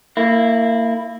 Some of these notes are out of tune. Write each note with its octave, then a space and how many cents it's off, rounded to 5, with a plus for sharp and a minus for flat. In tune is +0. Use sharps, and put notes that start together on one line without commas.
A#3 -25 E4 +0